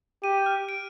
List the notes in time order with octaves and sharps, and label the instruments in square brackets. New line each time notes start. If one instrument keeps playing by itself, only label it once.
[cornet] G4 [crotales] D#7
[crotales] F6
D7